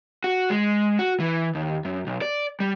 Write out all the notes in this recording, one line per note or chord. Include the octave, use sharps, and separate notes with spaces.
F#4
G#3
F#4
E3
D#2
F#2
B1
D5
G3